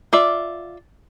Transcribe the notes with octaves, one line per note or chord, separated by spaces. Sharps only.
F4 D5 E5